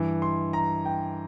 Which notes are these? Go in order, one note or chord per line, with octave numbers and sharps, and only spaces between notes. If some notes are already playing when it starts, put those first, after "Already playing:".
Already playing: G2 E3
C6
A#5
G5